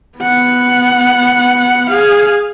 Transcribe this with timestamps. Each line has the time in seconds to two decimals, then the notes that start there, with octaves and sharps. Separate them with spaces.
0.18 B3 F#5
1.89 G#4 F5